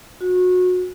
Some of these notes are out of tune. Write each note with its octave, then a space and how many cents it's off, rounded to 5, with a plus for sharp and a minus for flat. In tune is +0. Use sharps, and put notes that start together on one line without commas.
F#4 -25